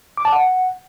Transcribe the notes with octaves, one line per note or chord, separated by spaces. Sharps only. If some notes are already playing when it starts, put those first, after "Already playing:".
D6
A5
F#5